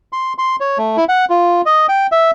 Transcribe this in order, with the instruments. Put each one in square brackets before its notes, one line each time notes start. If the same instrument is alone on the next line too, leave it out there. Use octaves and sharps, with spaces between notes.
[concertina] C6
C6
C#5
A3
E4
F#5
F4
D#5
G5
E5